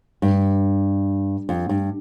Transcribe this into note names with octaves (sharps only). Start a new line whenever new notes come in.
G2
F2
G2